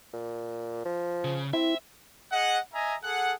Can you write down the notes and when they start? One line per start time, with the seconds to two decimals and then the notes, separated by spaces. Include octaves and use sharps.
0.13 A#2
0.85 F3
1.24 C#3
1.53 C4 E4 E5
2.32 G#4 D#5 F#5
2.73 D#5 E5 G#5 A#5
3.03 G#4 A4 F#5